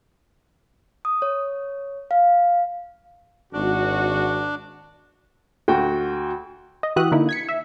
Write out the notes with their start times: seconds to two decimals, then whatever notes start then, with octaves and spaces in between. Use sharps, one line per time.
1.05 D#6
1.22 C#5
2.11 F5
3.53 G#1 D4 F#4
5.68 D2 F#4 G5
6.83 D#5
6.96 E3 F#4 G4 E5 D#6 F#6
7.12 D3 A#3 D#4 E4
7.29 G#6 B6 C#7
7.49 E5